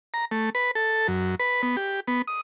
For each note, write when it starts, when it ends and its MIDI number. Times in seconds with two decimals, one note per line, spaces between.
0.14 0.25 82
0.31 0.50 57
0.55 0.71 71
0.75 1.07 69
1.08 1.35 42
1.40 1.62 71
1.63 1.76 59
1.77 2.00 67
2.08 2.22 59
2.28 2.41 87